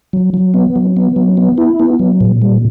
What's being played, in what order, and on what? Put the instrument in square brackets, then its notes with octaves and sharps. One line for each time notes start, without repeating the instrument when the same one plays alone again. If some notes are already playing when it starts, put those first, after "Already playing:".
[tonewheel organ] F#3
F#3
B3
F#3
B3
F#3
B3
E4
B3
F#3
A#2
G3